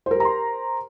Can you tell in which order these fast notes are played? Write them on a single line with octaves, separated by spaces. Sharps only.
C5 A#4 G4 A#5 C6